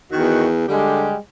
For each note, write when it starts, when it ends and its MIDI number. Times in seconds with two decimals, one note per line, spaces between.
0.11 0.64 40
0.11 0.46 51
0.11 0.46 66
0.68 1.13 50
0.68 1.15 55
0.68 1.15 56
0.68 1.15 67